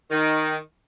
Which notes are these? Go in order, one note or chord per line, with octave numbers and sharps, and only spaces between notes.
D#3